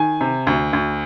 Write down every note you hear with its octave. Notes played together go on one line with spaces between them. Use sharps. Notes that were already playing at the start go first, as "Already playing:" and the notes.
Already playing: D#3 G#5
C3
D2
D2